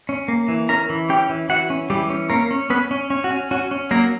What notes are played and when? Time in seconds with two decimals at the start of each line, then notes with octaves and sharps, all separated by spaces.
0.09 C#4
0.28 A#3
0.48 E3
0.69 C#4 A#4 A#5
0.90 E3
1.09 C#4 G4 G5
1.29 E3
1.49 E3 F#4 F#5
1.70 C#4
1.90 E3 G3 G4
2.10 C#4
2.30 A#3 C#4 A#4
2.51 C#4
2.70 B3 C#4 B4
2.91 C#4
3.10 C#4
3.24 F#4
3.31 C#4
3.51 C#4 F#4
3.71 C#4
3.91 F#3 A#3 A#4